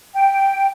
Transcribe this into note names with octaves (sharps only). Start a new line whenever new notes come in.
G5